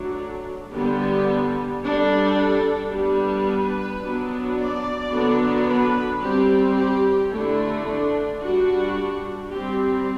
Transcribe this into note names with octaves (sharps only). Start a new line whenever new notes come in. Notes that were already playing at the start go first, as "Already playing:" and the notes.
Already playing: F#3 A3 D4
D3 G3 B3 G4
G3 D4 A4
G3 B3 D4
B4
F#3 B3 D4
D5
D3 F#3 B3 D4
B4
G3 C4 G4
G4
D3 A3 D4 E4
D4
G3 D4 F#4
G3 C4 G4